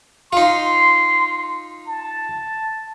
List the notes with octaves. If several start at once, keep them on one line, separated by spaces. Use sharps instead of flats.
D#4 F4 C6
A5